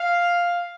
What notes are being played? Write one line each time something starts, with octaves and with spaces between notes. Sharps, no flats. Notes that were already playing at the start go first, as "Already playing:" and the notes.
Already playing: F5